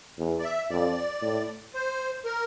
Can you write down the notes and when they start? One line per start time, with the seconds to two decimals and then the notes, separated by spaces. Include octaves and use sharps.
0.18 E2
0.39 D5
0.44 E5
0.70 F2 D5
1.22 A2
1.74 C5
2.25 A#4